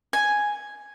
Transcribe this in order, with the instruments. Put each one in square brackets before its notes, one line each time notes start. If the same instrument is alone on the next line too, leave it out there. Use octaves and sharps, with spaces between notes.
[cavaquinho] G#5